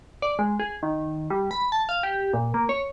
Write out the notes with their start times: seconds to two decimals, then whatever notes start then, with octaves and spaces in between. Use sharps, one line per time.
0.22 D5
0.39 G#3
0.59 G#4
0.83 D#3
1.30 G3
1.51 B5
1.72 A5
1.89 F5
2.03 G4
2.34 A#2
2.54 A#3
2.69 C#5